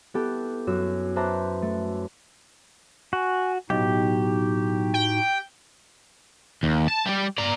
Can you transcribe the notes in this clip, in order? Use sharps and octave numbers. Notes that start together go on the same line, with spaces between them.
B3 E4 G4 A4
F#2 F#4 E6 E7
B4 C5 E5 A5 A#5 D6
A3
F#4 G#5
B1 A2 D#4 F#4 G4
G5
D#2
A5
G3 G4
D5 A#5